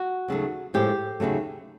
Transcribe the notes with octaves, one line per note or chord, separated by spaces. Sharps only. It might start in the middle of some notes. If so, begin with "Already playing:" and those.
Already playing: F#4
D#2 C#3 F#3 A3
A2 F3 G#3 G4
D#2 C#3 F#3 A3